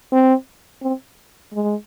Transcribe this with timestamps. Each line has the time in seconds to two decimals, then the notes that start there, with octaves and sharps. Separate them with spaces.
0.12 C4
0.82 C4
1.53 G#3